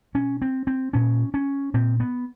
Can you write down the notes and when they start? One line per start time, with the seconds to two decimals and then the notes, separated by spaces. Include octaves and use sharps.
0.14 B2 C#4
0.42 C4
0.67 C4
0.93 A#2 C#4
1.34 C#4
1.74 A#2 C4
2.00 B3